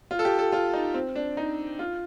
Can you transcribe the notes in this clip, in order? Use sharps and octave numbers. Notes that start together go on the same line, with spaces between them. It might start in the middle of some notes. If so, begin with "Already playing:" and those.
F4
A4
G4
A4
F4
D#4
C4
D4
D#4
F4